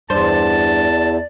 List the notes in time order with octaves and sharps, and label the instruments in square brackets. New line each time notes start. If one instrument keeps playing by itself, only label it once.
[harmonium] E2 [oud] G2 C5 [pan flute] D5 [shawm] A5